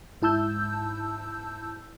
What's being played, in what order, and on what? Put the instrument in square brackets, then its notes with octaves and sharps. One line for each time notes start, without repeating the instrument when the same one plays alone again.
[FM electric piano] G#2 E4 A5 E6 G6